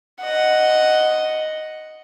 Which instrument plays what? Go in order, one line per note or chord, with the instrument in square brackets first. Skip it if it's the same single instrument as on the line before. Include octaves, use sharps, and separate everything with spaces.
[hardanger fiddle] D#5 F#5